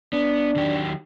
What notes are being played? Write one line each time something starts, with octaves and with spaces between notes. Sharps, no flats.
B3 D4
D#3 F#3 G4